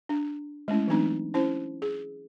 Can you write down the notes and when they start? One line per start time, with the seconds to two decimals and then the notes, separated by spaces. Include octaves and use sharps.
0.09 D4
0.68 G#3 A3 C#4 E4
0.87 E3 F#3 A3 C4 D4 D#4
1.34 C#4 E4 C5
1.82 G#4